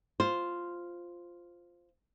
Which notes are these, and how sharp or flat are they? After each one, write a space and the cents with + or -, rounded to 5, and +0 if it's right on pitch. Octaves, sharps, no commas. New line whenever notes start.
F4 +0 C5 +0